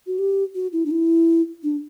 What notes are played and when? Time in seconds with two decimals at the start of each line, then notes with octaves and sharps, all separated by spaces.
0.07 F#4
0.19 G4
0.55 F#4
0.73 E4
0.86 D4
0.91 E4
1.63 D4